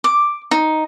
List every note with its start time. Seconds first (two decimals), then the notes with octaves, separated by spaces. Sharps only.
0.04 D6
0.51 D#4